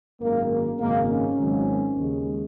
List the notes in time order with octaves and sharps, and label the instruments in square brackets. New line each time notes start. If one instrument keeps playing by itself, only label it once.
[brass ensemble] G#1 F#2 D#3 G#3 A#3
A#3
G#1 F#2 C#3 G#3 A#3
C#4
G#1 G#2 F#3
D#2 C#3 G#3